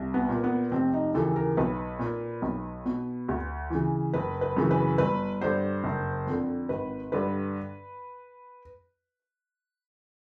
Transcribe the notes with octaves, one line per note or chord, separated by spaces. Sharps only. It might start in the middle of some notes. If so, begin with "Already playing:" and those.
Already playing: C2
B3
A#2
B3
F1 C4
D#4
D#2 C#3 E3 A4
A#4
B1 B4
A#2
B1
B2
D2
C#3 E3
F#1 B4
B4
F#2 C#3 E3
B4
G1 B4
G2 D3 C5
F#1
F2 D3
G#1 B4
G2 D3 B4